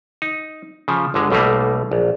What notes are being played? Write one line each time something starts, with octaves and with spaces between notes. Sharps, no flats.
D#4
C#3 F3
G1 D3 G#3
B1 B2 G3 A3 A#3
A#1